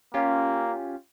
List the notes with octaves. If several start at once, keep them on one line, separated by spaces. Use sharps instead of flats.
A#3 C#4 F4 G4